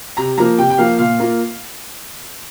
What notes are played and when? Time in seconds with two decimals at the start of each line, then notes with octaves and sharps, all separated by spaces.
0.17 C3 A#5
0.38 F3 A#3 A#5
0.58 C3 G5
0.70 G5
0.78 F3 A#3 F5
0.99 A#2 F5
1.20 A#3 F4